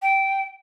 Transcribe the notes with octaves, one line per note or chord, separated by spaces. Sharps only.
G5